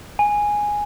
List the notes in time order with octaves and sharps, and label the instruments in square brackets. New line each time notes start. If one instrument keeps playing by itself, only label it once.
[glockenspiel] G#5